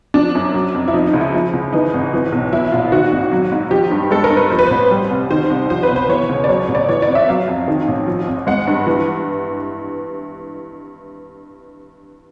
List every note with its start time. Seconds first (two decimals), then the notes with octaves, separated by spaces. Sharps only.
0.14 F3 D4
0.35 F#2
0.54 F#3
0.74 F2
0.88 E4
0.93 F3 D#4
1.07 D#4
1.13 C#2
1.21 E4
1.34 F3
1.53 C#2
1.73 E3 D#4
1.94 G#1
2.13 E3
2.32 B1
2.53 E3 E4
2.72 A#1 F4
2.92 D#3 F#4
3.13 G#1
3.31 F#3
3.52 G#2
3.71 F3 G4
3.91 G2
4.10 G#3 A4
4.24 A#4
4.30 G2
4.37 B4
4.50 F3 C5
4.59 B4
4.67 A1 C5
4.91 G3
5.10 C2
5.31 D#3 C5
5.50 C2
5.69 F3 C5
5.83 B4
5.89 B1
5.96 C5
6.09 E3 C#5
6.29 C#2
6.44 D5
6.48 F#3 C#5
6.69 A1
6.75 D5
6.89 E3 C#5
7.02 D5
7.08 G#1
7.15 E5
7.29 F#3 F5
7.48 F2
7.68 D#3
7.88 A1
8.07 F3
8.27 G#1
8.47 G#3 F#5
8.67 G2
8.87 E3